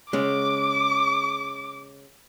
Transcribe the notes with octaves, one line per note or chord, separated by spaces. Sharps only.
C#3 G#3 D6